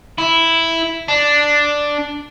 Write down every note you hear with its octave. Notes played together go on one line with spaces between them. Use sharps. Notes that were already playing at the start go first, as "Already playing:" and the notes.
E4
D4